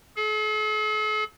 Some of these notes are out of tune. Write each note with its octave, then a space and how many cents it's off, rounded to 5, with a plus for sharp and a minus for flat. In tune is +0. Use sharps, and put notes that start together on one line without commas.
A4 -45